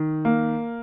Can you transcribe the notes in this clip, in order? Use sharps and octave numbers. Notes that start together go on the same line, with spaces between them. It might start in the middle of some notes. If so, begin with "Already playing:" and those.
Already playing: D#3
A#3